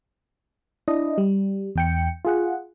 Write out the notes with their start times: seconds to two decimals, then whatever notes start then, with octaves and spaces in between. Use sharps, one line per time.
0.88 D4 E4 D#5
1.18 G3
1.76 E2 G5 C#7
2.25 F4 G#4 F#5